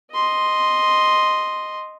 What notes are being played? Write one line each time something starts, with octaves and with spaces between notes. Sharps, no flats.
D#5 C6